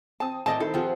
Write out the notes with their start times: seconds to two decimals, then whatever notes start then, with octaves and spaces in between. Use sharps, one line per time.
0.20 C4 A5 D#6
0.46 A2 C4 A#4 D5 D#5 A5
0.60 D#3 E4 A4 C5
0.74 F3 C4 F4 G4 G#4 F#5